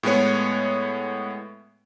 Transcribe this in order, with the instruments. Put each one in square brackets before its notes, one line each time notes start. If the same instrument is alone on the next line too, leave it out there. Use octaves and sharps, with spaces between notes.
[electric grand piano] A2 G#3 B3 C#5